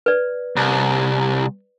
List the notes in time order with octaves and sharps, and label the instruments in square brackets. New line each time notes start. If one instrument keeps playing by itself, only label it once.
[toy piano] B4 D5
[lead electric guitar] C2